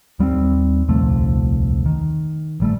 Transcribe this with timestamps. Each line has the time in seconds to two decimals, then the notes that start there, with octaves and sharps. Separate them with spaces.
0.19 D#2 G3 B3 C4
0.88 D#1 C2 F2 A3
1.86 D#3
2.60 A1 G3 A3